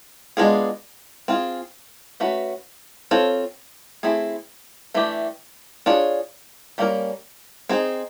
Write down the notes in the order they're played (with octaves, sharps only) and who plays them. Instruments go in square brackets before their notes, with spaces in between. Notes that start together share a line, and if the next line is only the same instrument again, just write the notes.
[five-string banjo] G#3 B3 D4 F4 G#4
C4 F4 G#4
A3 C#4 F#4 B4
C4 F4 A4 C#5
A3 C4 E4 G#4
E3 A3 D4 G4
D4 F4 G#4 C#5
G3 A#3 C#4 F#4 A#4
C4 D#4 G#4